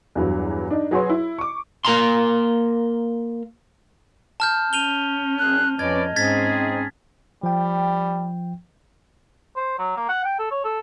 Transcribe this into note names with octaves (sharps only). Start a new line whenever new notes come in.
E2 G2 E3 F#3
D4 D#4
F#3 F#4 G#4 B4 C#5 C6
E4
C#6 D6
A#3 A#4 A#5 C6
A5 F6 G6
C#4 D#7 F7 G7
F#1 F#2 G#4 F#6
F2 C#4 B4 D5 D#5 G#6
G#2 C4 C#4 D#4 G#4 G#6 A6 B6
F3 G3 G5
C5
F#3
A#3
F#5
G5
A4
C#5
A4